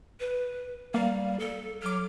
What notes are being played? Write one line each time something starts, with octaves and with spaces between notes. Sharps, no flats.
B4
G3 A#3 F5
A4
F#3 D6 F6